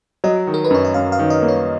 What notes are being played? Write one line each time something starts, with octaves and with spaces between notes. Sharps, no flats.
F#3 D#5
D#3
A#4
B4
F#2 C#5
D#5
F#2 F5
F5
D#3
D#5
A#3
C#5